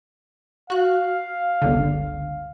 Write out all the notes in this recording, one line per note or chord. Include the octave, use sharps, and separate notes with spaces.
F#4 F5 F#6
G1 C#2 D3